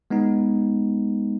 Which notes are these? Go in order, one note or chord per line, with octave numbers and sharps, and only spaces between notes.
G#3 B3 D#4